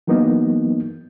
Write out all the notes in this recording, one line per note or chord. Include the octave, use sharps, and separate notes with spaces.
E3 F#3 A#3 B3 D#4